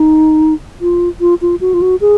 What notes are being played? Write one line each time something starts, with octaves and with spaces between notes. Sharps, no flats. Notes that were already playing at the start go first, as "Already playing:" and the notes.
Already playing: D#4
F4
F4
F4
F#4
F4
F#4
G#4